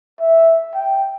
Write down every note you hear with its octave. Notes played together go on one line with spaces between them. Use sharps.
E5
G5